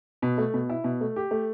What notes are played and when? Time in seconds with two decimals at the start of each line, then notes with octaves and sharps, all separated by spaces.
0.22 B2
0.38 A3
0.54 B2
0.70 E4
0.84 B2
1.01 A3
1.16 G4
1.31 A3